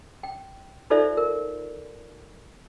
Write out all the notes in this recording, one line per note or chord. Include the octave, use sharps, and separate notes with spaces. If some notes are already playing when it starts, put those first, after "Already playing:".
G5
D#4 F4 A4 C5 D5 E5
A#4